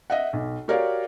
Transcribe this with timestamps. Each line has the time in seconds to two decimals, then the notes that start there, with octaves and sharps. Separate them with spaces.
0.10 D#5 E5 F#5
0.33 B1
0.68 F#4 G4 A#4 C#5 D5 F5